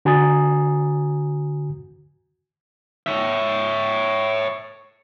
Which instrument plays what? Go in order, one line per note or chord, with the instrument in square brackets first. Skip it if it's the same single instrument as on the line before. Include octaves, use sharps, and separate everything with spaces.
[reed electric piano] D3 F#4 G#5 A#5 D#6 A6
[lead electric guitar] C#5 E5